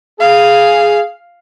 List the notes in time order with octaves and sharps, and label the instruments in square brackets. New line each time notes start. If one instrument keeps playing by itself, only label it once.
[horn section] G#4 [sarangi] F5